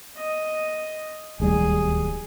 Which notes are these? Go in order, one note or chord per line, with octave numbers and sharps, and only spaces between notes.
D#5
D1 D#2 G3 G#4